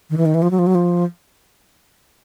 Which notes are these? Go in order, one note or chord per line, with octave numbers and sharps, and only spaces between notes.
D#3
E3
D#3
E3
F3
F#3
F3
F#3
F3